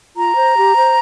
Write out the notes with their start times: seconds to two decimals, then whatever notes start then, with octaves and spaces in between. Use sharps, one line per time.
0.15 F4 A#5
0.36 C5
0.55 G4
0.75 C5